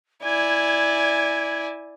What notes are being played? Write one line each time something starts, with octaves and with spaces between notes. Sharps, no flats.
E4 D5 G#5 G#6